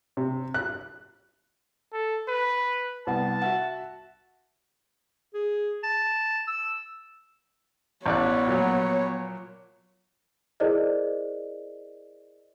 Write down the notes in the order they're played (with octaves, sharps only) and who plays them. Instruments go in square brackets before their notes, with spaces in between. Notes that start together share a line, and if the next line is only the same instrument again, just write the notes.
[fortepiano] C3
F#6
[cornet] A4
B4
[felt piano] C2 B3 F#5 [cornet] A5
[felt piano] F#4 E5 F#5
[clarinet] G#4
A5
E6
[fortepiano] A1 D5 F#6 [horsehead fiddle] B3 C#5
[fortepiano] A#2 F3 F#3
[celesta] E4 G#4 A#4 C5 D5 D#5